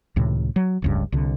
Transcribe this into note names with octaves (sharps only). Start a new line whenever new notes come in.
C#2 A2 C3 D#3
F#3
F1 C#2 G2
C2 D3